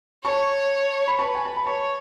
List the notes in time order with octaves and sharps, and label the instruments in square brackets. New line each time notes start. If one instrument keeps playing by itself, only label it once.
[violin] C#5 [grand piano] A5 C#6
[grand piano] B5
[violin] B4 [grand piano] A5 C#6
[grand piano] G#5
A5
B5
[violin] C#5 [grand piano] A5 C#6